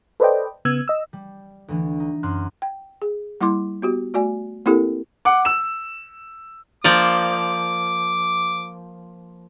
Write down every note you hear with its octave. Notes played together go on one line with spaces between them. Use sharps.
A4 B4 C5 D5 D#5 G5
C#3 B3 E6 G#6
D#5 E6
G3
D2 E3 D4
D#4
F#2 C6 F6 F#6
G5
G#4
G3 A#3 E4 C6 D6
B3 F#4 G4
A3 F#4 D5 G#5
A#3 C4 E4 G4 A4 A#4
F#5 D6
E6 E7
F3 A#3 D5 D6